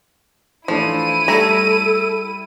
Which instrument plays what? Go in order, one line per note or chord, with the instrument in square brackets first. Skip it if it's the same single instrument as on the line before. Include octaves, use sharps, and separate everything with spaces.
[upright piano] E3 A3 D4 [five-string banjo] F3 [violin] E4 D#7
[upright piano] G3 G#6 [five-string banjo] A3 A#5 [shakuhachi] A4